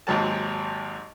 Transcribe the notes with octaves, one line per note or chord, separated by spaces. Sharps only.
G#1 D#2 G#2 F#3 A5